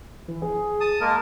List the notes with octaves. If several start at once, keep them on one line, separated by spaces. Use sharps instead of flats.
E3
G#4
A5 D#6
G#3 A#3 A#4 A5